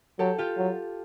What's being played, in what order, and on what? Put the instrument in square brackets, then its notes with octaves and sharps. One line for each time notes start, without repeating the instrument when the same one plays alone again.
[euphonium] F#3 [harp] G4 A4
[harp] F4 G4
[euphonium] F#3